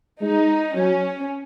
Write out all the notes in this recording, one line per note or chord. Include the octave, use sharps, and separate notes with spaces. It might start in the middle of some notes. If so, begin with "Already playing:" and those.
G#3 D#4
F#3 C#4